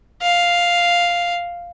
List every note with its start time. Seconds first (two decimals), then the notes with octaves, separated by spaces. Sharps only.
0.22 F5